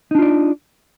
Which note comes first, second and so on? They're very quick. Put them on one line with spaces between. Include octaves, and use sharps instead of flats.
D#4 D4 F4 D5